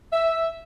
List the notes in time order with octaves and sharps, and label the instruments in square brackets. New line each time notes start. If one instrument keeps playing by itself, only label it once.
[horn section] E5